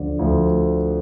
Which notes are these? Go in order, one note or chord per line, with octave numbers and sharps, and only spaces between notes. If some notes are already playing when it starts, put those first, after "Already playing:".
Already playing: D2 D3 F3 D5
D2 D3 F3